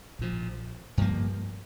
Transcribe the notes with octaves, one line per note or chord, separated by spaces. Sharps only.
A#1 A#2 F3
G2 F3 A#3